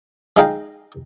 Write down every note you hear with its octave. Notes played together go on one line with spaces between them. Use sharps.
G#3 D#4 G#4 F5 G5